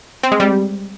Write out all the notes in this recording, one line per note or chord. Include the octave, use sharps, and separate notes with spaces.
C4
G#3
G3